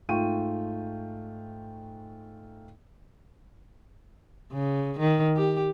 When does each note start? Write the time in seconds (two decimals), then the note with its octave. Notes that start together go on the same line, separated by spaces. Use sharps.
0.09 G#2 A3 F4 G5 C#6 D#7
4.53 C#3
4.99 D#3
5.36 G4